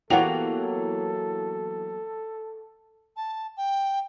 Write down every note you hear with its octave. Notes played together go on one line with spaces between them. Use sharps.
E3 F#3 A#3 B3 G4 A4 F#5 F7
A5
G5